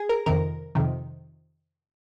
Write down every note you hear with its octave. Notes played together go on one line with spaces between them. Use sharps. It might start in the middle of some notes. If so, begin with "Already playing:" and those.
Already playing: G#4
A#4
F2 C3 D#3 A#4
F2 C3 D#3